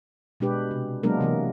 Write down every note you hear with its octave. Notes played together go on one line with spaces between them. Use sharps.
B2 G#3 D4 G4 B4
C3
F#3 G#3 A#3 B3 D4 A#4
C3 E3 A#3